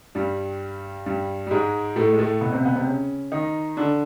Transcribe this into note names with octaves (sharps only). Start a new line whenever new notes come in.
G2 G3
G2 G3
G3
G#2 G#3
A2 A3
G#3
A2 A3
B2 B3
C3 C4
B2 B3
C3 C4
C#3 C#4
D#3 D#4
D3 D4